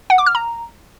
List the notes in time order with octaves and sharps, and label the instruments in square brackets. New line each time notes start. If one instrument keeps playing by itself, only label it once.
[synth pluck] F#5
D6
F6
A#5